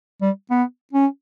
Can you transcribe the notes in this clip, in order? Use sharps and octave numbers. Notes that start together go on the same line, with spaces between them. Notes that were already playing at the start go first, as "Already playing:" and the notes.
G3
B3
C#4